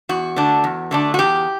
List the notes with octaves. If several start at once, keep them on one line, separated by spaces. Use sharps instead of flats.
E2 F#4
D3 A3 D4
E2
D3 A3 D4
F#4
E2 G4